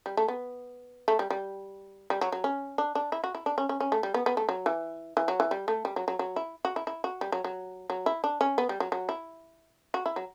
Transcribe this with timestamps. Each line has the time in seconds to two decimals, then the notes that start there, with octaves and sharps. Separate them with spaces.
0.06 G3
0.17 A3
0.28 B3
1.08 A3
1.19 G3
1.30 G3
2.10 G3
2.21 F#3
2.32 F#3
2.44 C#4
2.78 D4
2.95 D4
3.12 E4
3.24 F#4
3.35 E4
3.46 D4
3.58 C#4
3.69 C#4
3.80 C#4
3.92 A3
4.03 G3
4.14 B3
4.26 B3
4.37 A3
4.49 F#3
4.66 E3
5.17 E3
5.28 F#3
5.40 E3
5.51 G3
5.68 A3
5.85 G3
5.96 F#3
6.08 F#3
6.19 F#3
6.36 E4
6.65 F#4
6.76 E4
6.87 E4
7.04 F#4
7.21 G3
7.32 F#3
7.44 F#3
7.90 F#3
8.06 E4
8.24 D4
8.41 C#4
8.58 B3
8.69 G3
8.80 F#3
8.92 F#3
9.09 E4
9.94 F#4
10.06 E4
10.16 F#3